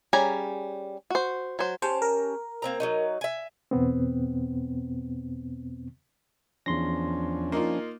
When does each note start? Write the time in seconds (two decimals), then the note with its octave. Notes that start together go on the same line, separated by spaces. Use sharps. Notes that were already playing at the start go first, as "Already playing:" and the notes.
0.13 G3 C#4 G#4 G#5 A#5
1.10 F#4 C5
1.59 F#3 C5
1.82 C#4 G4 C5 A5
2.02 A#4
2.62 A#3 C4 A#5
2.80 F#3 C#4 D#4
3.21 E5 G#5
3.71 E2 B2 B3 C4
6.66 E2 F3 C#4 D4 C6 A#6
7.52 A#3 D#4 F4